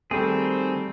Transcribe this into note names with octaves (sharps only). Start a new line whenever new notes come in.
D#3 G3 A3 C4 G#4